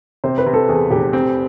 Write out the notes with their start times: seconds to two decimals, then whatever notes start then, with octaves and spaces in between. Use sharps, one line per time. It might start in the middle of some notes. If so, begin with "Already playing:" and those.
0.24 C3 C5
0.38 B4
0.46 C3
0.53 A4
0.69 E2 G#4
0.90 F1 G4
1.13 C4